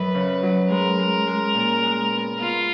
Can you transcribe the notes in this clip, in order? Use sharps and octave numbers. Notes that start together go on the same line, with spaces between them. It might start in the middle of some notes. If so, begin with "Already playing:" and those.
Already playing: F#2 F#3 B4
C#3
F#3
G#3 A#4
G#3
G#3
A#2
G#3
B3
B3 F4